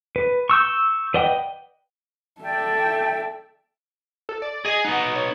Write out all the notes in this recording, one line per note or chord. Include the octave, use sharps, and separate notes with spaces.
B4
C#6 E6 G6
B4 D5 D#5 F#5 G5
A4 D5 E5 G5
A4
D5
G#4 D#5 G#5
B3 D#4 F#5
C#5